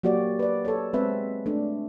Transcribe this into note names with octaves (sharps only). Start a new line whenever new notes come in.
F#3 A#3 F#4 G4 D5
B4 D5
A4 C#5
G#3 C4 B4 E5
A3 D4